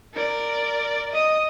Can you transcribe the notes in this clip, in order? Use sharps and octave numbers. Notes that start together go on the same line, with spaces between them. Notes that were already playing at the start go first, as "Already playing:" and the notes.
A#4 D5
D#5 D#6